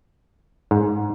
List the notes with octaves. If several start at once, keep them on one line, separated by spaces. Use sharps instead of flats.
G#2